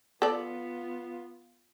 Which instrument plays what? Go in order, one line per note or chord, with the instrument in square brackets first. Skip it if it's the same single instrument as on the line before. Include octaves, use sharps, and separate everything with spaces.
[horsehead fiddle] B3 F4 [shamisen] A4 D5